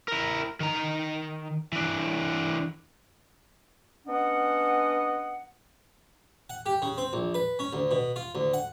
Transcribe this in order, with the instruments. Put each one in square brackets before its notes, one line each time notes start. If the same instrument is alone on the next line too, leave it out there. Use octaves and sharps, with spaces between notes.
[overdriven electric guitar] E4 A#4
D#3 A#5
E3 D4
[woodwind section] B3 C#4 D4 D#5 F#5
[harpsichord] F#5
G4
C#3
C4
A#1
B4
C#4
D2
B2
F4
D2
F#5